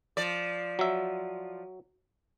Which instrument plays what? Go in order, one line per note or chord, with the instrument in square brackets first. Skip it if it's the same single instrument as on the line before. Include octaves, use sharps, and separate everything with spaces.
[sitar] F3 D5
[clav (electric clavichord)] F#3 E5